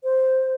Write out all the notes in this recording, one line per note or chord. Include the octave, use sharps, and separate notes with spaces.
C5